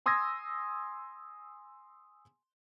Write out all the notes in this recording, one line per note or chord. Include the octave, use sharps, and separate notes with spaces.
G#5 C6 D#6 E6 G#6 A#6